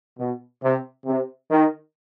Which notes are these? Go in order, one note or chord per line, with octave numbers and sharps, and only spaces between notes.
B2
C3
C3
D#3